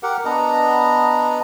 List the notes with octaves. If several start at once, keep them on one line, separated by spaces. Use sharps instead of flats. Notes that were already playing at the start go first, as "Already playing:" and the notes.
G4 A#4 F#5
B3 D4 D#5 A#5